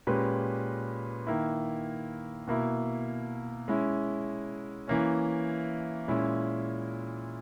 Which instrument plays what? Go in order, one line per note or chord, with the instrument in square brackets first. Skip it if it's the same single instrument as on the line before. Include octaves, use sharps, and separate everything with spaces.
[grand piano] A#2 G#3 C#4 G4 B4
D#3 A#3 E4
B2 A#3 E4
G#3 C#4 E4
E3 A#3 C#4
A#2 G#3 C#4 E4